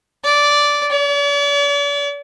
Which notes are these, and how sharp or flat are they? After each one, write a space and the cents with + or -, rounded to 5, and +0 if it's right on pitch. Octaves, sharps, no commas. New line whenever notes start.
D5 -10
D5 -45